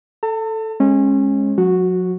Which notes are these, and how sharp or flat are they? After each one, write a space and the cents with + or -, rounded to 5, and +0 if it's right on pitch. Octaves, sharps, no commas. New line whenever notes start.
A4 +0 A5 +40
G#3 +0 C#4 -25
F#3 -45 F#4 -5